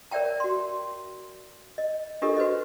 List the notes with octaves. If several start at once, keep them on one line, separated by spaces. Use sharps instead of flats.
A#4 C#5 D5 E5 G5 A5
F#4 C6
D#5
D4 F4 G4 A4 A#4 D#5
F#4 B4 C5 D#5